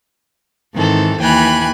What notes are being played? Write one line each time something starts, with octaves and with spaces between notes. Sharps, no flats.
G#2 D#3 E3 C4 A4
D#2 E3 G5 G#5 B5 F#6